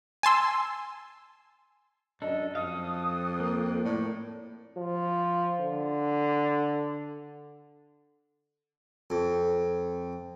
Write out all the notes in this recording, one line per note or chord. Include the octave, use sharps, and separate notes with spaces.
G#5 A5 C6 E6
F#2 D4 A4 D#5
F2 A4 F5 D#6
A#3
A2 D5
F3
D3
F2